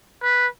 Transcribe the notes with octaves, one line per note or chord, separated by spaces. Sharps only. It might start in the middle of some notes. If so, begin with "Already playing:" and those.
B4